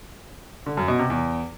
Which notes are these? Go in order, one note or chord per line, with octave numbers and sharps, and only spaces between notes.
D3
F#2
B2
C3
E2